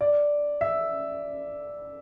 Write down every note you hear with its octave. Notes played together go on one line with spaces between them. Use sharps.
D5
E5